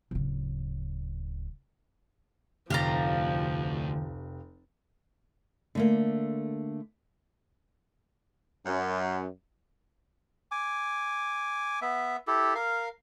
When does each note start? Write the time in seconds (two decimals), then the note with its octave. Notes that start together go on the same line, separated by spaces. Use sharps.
0.11 D1 C#3
2.70 F1 D2 F3 G4 F5 A#5 A6
5.75 D3 A3 A#3
8.66 F#2
10.52 G#5 D6
11.82 B3 E5
12.27 E4 G4 A4
12.55 A#4 F5